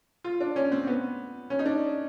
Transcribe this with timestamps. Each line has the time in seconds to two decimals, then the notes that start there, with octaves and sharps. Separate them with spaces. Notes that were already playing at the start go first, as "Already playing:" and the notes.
0.24 F4
0.40 D4
0.56 C#4
0.72 C4
0.87 B3
1.50 C#4
1.59 D#4
1.66 D4